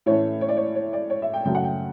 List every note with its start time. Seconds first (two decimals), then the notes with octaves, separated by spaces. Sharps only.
0.06 A2 E3 A3 C#4 C#5
0.41 C#5
0.49 D5
0.57 C#5
0.75 C#5
0.93 D5
1.10 C#5
1.22 E5
1.34 G5
1.45 F#2 C#3 F#3 A3 G5
1.55 F#5
1.64 G5